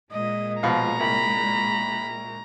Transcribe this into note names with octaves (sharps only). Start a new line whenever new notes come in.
A#2 G#3 D#5
B2 F3 F5 A#5
C2 B5